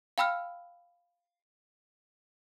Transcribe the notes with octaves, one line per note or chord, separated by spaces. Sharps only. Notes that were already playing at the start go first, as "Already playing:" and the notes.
F5 G5 B5 E6 F6